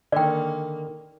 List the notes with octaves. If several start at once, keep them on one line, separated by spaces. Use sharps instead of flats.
D3 D#3 A#3 D5 G5